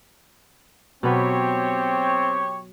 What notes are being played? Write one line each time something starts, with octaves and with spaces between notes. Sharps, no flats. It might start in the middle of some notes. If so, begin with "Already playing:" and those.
B2 F#3 C4 G4 B4 C#5